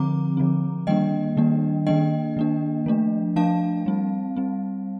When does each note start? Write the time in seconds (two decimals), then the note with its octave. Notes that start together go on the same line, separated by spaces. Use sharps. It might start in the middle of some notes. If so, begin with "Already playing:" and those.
Already playing: D3 F3 C4 A#5 D6
0.37 D3 F3 C4
0.87 D#3 G3 A#3 D4 D#5 G5
1.37 D#3 G3 A#3 D4
1.87 D#3 A#3 D4 D#5 G5
2.37 D#3 A#3 D4
2.86 F3 A3 D4
3.36 F3 A3 D4 F5 A5
3.86 G3 C4
4.36 G3 C4